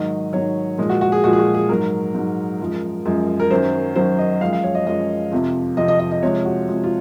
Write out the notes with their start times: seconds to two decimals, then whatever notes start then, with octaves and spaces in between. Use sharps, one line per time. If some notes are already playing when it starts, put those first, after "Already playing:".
Already playing: G#2 D#3 F#3 D#5
0.33 G#2 D#3 F#3 C#5
0.78 A#2 F3 G#3
0.89 F#4
1.01 F#4
1.12 G#4
1.24 A#2 F3 G#3 F#4
1.33 G#4
1.39 F#4
1.54 G#4
1.69 G#2 F#3 A#4
2.14 G#2 F#3
2.60 F#2 F3 G#3
3.05 F#2 F3 G#3
3.40 A#4
3.51 F#2 D#3 F#3 C5
3.96 F#2 D#3 F#3 C5
4.18 D#5
4.41 F#2 F3 G#3 F5
4.53 F5
4.64 C#5
4.75 D#5
4.87 F#2 F3 G#3 D#5
5.31 F2 C3 F3
5.77 F2 C3 F3 D#5
5.88 D#5
6.00 D#5
6.11 D#5
6.23 C3 F3 G#3 C#5
6.45 F#4
6.68 C3 F3 G#3
6.84 F4